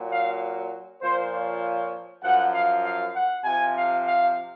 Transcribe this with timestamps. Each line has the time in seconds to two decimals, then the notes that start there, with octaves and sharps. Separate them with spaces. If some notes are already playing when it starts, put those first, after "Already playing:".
Already playing: A#2 F#3
0.10 F5
1.01 A#2 F3 C5
1.32 C#5
2.23 F#2 F3 F#5
2.53 F5
2.83 F5
3.14 F#5
3.44 C3 F3 G#5
3.75 F5
4.05 F5